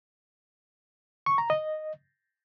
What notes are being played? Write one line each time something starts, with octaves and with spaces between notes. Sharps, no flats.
C#6
A#5
D#5